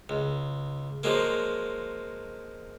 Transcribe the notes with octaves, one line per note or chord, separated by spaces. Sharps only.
C#2
F3 F#3 G#3 A#3